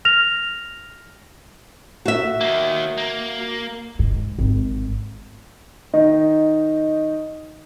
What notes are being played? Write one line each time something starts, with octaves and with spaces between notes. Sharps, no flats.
F6 A#6 F7
F#4 E5
D#3 A#3
A#3
G#2
G#1
D#3 D#4 D#5